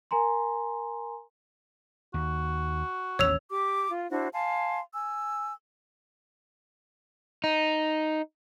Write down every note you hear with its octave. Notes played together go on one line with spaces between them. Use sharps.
A#4 G#5 A#5 C6
D#2 F#4
A1 D#2 C#4 C#5 E6 F7
G4 D6
F4
D4 E4 F#4 C5
F5 G#5 A5 C6
G#5 E6
D#4